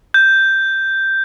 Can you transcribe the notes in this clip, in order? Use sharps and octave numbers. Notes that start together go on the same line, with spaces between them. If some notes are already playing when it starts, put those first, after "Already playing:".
G6